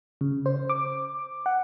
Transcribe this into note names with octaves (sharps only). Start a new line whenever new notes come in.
C#3
C5
D6
F#5